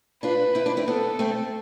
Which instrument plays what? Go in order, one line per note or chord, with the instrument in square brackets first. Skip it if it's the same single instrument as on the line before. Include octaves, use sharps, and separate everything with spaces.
[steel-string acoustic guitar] D4 F4 [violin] B4
[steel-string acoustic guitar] C4 E4
D4 F4
C4 E4
[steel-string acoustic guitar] B3 D4 [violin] A4
[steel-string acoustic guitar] A3 C4